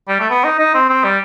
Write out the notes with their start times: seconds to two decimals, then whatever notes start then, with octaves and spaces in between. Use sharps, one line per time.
0.08 G3
0.20 A3
0.30 B3
0.44 D#4
0.59 D#4
0.74 C4
0.89 C4
1.04 G3